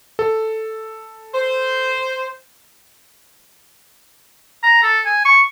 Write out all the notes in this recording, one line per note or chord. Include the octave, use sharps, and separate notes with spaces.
A4
C5
A#5
A4
G#5
C#6